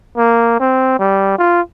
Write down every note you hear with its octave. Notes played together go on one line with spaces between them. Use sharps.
A#3
C4
G3
F4